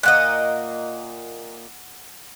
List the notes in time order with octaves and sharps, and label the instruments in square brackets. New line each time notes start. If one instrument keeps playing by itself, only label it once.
[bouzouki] A#2 A#3 D#5 [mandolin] F#5 F#6